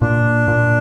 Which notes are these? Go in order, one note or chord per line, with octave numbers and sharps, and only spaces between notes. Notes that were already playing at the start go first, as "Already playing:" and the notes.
A#2 D4
A#2